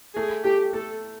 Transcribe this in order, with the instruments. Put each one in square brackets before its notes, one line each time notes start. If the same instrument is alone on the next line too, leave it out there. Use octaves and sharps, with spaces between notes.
[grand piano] A3 [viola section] G#4
[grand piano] A3 [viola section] G4
[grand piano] A3 [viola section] A4